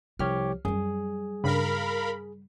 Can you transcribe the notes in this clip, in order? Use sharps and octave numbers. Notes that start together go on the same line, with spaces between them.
C2 F3 G4 C#5 F6
F#2 F#3 G3 G#4
G2 C#3 A#4 F5 B5